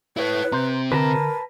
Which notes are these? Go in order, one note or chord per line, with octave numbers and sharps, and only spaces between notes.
E4 B4 C#5
C3 C4 A#5 C6 G6
D3 A#4 B4 A5 A#5